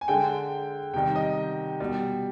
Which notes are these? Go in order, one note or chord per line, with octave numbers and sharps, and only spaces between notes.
G#5
D3 G#3 G5
C3 D#3 G3 G5
D#5
B2 G3